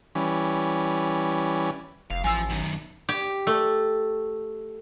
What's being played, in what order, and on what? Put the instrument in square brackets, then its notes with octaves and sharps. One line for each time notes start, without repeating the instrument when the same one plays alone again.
[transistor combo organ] E3 G3 C#4
[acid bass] F1 [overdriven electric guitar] F5
[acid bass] A1 [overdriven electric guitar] F3 [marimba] G#5 E6
[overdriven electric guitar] F#2 D#3
[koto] G4
A3